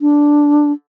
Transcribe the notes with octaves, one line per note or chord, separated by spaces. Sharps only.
D4